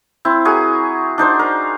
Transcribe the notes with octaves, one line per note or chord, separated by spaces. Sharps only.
C4 E4
F#4 G#4 A#4 G#5
D4 D#4 C5 D5
A#4